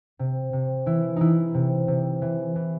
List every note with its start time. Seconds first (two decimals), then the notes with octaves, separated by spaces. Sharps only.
0.19 C3
0.53 C3
0.86 E3 E4
1.16 E3 D#4 E4
1.54 C3
1.88 C3
2.22 E3
2.56 E3